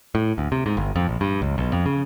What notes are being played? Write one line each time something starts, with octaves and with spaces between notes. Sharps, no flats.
A2
D2
C3
G#2
G1
F2
A#1
G2
C#2
B1
F2
C#3